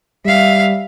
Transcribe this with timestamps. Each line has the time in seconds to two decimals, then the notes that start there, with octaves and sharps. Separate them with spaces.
0.25 G3 E5 F5